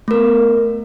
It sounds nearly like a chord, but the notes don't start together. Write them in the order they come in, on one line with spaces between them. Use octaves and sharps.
A3 A#4 B3